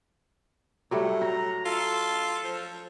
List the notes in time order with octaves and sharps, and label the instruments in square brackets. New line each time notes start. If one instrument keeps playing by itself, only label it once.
[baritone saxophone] A2 [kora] F#3 G3 A3
[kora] F#4 [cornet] A#5
[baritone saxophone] F4 [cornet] A4
[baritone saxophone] F3